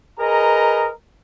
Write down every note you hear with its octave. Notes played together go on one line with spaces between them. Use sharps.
G#4 A#4 B4 D#5 A#5